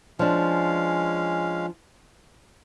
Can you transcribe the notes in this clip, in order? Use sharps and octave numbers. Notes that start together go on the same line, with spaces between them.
F3 G#3 C#4 D4 F5